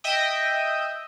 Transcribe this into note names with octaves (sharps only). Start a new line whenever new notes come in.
D#5 E5 G5 D#6